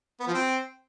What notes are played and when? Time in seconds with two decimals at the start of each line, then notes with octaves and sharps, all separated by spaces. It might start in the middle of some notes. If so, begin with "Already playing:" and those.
0.20 B3
0.27 F3
0.34 C4